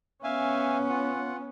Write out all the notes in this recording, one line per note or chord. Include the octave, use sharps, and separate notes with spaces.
B3 C#4 E5 F5 G#5
F4 F#5